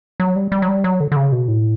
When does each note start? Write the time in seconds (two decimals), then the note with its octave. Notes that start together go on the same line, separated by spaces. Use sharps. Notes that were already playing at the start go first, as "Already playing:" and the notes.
0.20 F#3
0.36 G3
0.52 G3
0.62 F#3
0.68 G3
0.84 F#3
1.00 D3
1.12 D3
1.16 C#3
1.32 B2
1.48 A2